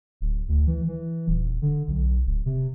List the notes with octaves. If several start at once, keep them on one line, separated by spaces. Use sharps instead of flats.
D1
D2
E3
E3
D#1
D3
B1
D1
C3